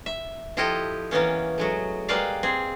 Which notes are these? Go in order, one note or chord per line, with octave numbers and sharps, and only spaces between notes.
E5
F3 E4 F4 G4 A4 D#5
E3 A#3 B3 C#4
F#3 G#3 A3
G3 G#3 A#3 B4 D5 F5
C4 G#4